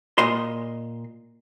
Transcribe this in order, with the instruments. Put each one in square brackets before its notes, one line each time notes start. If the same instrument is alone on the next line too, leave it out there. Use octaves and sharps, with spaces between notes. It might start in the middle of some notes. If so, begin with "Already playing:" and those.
[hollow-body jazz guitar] A#2 D#5 C6